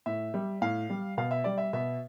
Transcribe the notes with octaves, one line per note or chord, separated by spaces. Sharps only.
A2 E5
G3
A2 F5
G3
B2 F5
E5
G3 D5
E5
B2 E5